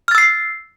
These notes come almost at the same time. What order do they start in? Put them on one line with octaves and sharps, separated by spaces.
F6 A6 E6 C7